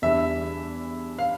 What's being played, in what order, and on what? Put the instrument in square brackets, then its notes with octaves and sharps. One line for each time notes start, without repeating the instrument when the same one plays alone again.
[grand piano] E2 E3 G3 D4 [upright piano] E5
[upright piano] F5